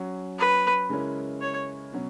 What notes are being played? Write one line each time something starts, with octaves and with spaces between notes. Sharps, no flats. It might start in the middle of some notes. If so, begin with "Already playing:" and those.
Already playing: F#3 C#4 F#4
B4
C#3 G#3 C#4 E4 A#4
C#5
B2 F#3 C#4